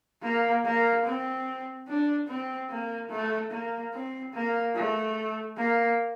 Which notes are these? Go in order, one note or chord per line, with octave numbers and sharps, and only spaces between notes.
A#3
A#3
C4
D4
C4
A#3
A3
A#3
C4
A#3
A3
A#3